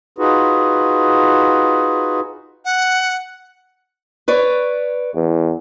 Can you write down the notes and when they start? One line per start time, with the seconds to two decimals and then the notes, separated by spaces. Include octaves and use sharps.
0.18 D#4 F4 F#4 G#4 B4
2.65 F#5
4.28 B4 C#5 D5
5.15 E2